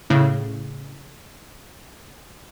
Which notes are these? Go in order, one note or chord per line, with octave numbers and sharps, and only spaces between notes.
A2 C#3